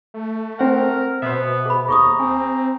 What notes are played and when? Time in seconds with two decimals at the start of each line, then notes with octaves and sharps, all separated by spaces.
0.14 A3
0.59 C4 A#4 F#5
1.22 B2 B3 C5 E5
1.66 G#4 B5
1.88 D#2 G#4 A#5 C#6 D#6
2.19 C4 G#5